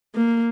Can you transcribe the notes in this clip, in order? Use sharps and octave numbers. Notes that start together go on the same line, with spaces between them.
A#3